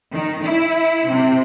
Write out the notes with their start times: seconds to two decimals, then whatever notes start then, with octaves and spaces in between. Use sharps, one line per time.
0.11 D#3
0.44 E4
1.10 C3